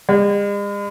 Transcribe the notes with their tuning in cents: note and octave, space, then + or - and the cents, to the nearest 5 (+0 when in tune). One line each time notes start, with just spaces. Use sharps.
G#3 -45